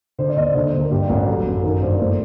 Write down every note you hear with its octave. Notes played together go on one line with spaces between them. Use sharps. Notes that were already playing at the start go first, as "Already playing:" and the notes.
D3 C5
D5
D#2 D#5
D5
D3 C5
C5
D#2
A#4
G2 G4
A1 F#4
F#3 A4
F#2
D#3 A#4
G2 C5
A2 C5